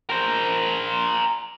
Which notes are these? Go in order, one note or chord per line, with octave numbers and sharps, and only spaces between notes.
A#4 C5